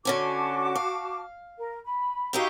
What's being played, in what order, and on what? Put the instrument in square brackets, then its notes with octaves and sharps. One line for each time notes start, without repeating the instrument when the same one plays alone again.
[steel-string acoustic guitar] D3 C#4 G#5 [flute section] F#4 A5 D6
[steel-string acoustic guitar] F5
[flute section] A#4
B5
[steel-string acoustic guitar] D#4 E4 G4 [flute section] F#4 F5 A#5